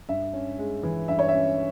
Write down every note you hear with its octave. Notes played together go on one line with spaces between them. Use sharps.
G2 E5
C#4
G#3
E3
G2 E5
C#5
C#4 E5